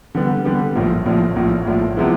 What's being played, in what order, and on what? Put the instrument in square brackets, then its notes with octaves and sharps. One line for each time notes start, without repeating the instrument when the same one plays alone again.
[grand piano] D3 G3 B3
D3 G3 B3
A#1 A2 F3
A#1 A2 F3
A#1 A2 F3
A#1 A2 F3
C3 F3 G#3 B3 E4